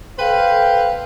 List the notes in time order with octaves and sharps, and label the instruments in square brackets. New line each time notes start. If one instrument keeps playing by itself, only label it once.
[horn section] A4 B4 C5 F5 G5